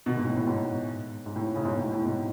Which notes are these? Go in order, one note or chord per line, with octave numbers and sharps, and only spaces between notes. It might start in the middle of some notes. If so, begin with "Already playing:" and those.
B2 D#3
G#2 B2
A2
A2
G#2 B2
G#2
A2
A2 C#3
G#2 B2
A2
A2
G#2 B2